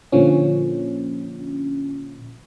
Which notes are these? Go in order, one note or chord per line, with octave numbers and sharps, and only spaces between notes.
A#2 D3 F3 C#4